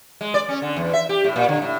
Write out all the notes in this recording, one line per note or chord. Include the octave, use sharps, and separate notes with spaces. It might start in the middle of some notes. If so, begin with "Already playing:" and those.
G#3
D5
C#4
D3
E2
E5
G4
A2
A#2
D3
A2